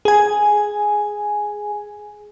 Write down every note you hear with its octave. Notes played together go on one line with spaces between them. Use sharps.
G#4 G#5